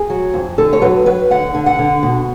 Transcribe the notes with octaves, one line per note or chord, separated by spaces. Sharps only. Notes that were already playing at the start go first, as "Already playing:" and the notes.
Already playing: G#4
F#3
F2
D3 A4
C#5
F#3 B4
F#3 B4
D3 F#5
D3
F#5
D3
B2